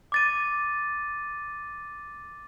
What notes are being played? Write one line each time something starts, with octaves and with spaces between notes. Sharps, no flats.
D6 A6 D#7